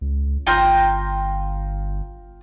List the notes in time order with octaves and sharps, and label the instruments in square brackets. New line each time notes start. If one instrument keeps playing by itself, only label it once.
[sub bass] C#2
[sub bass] G1 [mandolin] F4 G5 A#5